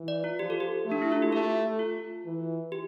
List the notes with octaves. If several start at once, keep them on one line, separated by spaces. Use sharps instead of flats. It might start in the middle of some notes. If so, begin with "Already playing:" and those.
Already playing: E3
D5
F4
F3 G4
A4
G4
A3
D4
E4
F4
G4
A3 A4
F4
E3
G4